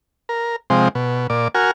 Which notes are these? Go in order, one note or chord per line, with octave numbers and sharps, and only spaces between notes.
A#4
C3 F3 G#3 C4
B2
A#2 D5
F#4 A#4 G#5 F6